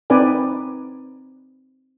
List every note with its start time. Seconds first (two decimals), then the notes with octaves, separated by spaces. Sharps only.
0.10 C4 D#4 B4 D5 G#5